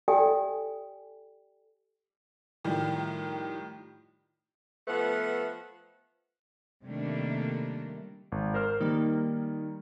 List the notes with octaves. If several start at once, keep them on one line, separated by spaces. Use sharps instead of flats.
G4 A4 D5 E5 G5 G#5
A2 D#3 F3 G3
F3 A3 B3 B4 F#5
C3 D#3 G3 A3 A#3 D4
G#1
A#4 C5 F6
D#3 G3 A#3 D#4